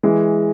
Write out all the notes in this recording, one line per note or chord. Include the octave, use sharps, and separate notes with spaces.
E3 G#3